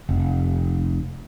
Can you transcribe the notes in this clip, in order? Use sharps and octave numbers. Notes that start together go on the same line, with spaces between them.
F1